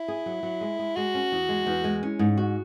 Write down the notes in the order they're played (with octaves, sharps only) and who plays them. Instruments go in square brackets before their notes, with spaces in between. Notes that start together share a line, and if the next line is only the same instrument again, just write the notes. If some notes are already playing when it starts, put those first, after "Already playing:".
Already playing: [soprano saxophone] E4
[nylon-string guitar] G#4
F#3
F#3
G#3
G#3
[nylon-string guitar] G#3 [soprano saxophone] F#4
[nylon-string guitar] C#4
E2
G#3
E2
G#3
C#4
G#2
F#4